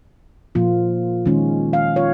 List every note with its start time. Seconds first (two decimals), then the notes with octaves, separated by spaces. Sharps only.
0.55 A#2 F3 A#3 F4
1.26 D#3 G#3 C#4 F4
1.73 F5
1.96 F4 C#5